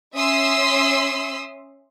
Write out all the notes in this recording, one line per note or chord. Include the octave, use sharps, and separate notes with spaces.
C#4 E5 C6 D#6 E6